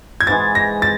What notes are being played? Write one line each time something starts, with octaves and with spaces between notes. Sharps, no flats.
G#6
G#2 E3 G#3 A6
A#6
A6